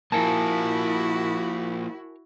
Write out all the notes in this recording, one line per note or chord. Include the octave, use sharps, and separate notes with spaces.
F3 A#3 E4 F#4 A#4 G#5 A5